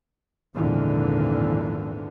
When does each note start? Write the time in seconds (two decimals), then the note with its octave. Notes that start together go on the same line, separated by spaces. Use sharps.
0.55 G#1 E2 A#2 D3 E3 F3